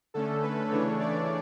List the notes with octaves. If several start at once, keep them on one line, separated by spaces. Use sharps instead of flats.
D3 A3 C#4 A4
B4
C#3 E3 A3 D4 C#5
D5